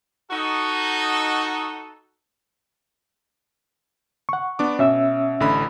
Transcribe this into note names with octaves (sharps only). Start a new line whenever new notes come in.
D#4 F#4 A4
F#5 C#6
B3 D4 D6
B2 C#4 E5 E6
A1 D3 B5